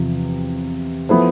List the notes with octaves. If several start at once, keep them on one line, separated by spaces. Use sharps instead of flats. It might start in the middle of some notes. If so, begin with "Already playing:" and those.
Already playing: E2 C3 F3
F3 B3 E4 A4 C5